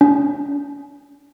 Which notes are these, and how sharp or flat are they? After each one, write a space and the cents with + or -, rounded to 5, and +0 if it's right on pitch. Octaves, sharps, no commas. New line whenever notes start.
C#4 +45